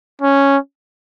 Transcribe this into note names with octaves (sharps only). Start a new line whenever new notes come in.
C#4